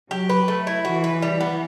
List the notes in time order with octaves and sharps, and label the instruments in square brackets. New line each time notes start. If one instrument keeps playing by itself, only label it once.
[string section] F#3 [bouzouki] G4
[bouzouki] B4
A3
E4
[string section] E3 [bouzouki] F#4
[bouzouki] B4
G3
B3